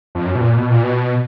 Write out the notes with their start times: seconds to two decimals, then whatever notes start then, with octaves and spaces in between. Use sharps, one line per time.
0.15 F2
0.26 F#2
0.35 B2
0.41 A#2
0.57 B2
0.70 A#2
0.83 B2